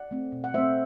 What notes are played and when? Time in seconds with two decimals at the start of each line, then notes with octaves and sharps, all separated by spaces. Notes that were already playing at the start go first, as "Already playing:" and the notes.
Already playing: D5 F#5
0.11 A3 C4
0.32 B2
0.44 F#5
0.54 A3 C4 C5 E5